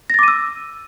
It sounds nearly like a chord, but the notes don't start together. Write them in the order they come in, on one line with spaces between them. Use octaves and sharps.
A#6 A6 D6 D#7 E6